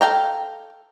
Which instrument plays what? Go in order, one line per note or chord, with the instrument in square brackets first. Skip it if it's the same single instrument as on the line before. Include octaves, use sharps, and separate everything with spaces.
[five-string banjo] A4 F5 G5 A#5